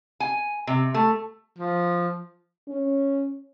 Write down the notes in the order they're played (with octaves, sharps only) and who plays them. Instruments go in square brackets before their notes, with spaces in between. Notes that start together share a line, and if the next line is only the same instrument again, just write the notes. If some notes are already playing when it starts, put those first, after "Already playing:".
[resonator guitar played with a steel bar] G#5
C3
A3
[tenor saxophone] F3
[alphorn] C#4